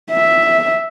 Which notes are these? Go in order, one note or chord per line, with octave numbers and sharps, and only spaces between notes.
E5